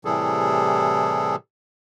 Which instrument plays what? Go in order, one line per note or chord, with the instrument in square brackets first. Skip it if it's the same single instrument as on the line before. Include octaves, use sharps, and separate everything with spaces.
[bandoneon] A2 C3 E3 G3 G#4 A4